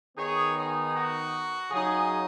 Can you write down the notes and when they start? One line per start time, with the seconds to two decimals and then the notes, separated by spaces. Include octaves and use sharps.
0.16 D#3 B3 D#4 G#4 C#5
0.56 G#4
0.93 F#4
1.71 C#3 F#3 D#4 G#4